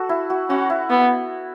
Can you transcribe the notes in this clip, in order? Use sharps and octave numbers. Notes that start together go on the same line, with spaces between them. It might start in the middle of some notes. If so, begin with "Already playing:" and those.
Already playing: F#4 A4
E4
F#4
C#4 F#4
E4
B3